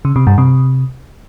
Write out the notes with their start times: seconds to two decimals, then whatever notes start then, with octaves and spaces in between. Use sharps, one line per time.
0.05 C#3
0.16 C3
0.27 G2
0.38 C3